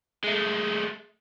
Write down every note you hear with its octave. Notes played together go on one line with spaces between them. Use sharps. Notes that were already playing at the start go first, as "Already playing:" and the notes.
G#3 A3